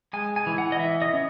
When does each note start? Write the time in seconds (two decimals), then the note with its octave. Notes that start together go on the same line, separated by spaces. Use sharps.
0.13 G#3 G#5
0.36 G#5
0.47 E3
0.58 F#5
0.72 D#5
0.80 E3 E5
1.02 D#5
1.14 C#4